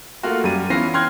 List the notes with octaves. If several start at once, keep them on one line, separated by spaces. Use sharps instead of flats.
A3 A#3 F4 F#4
F#2 G3 D#7
E3 B3 C#4 F4 A#6 C7
G5 C6 F6 F#6 G#6